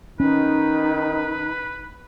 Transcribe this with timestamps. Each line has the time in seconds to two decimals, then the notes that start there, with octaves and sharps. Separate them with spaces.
0.20 D#3 C#4 D#4 B4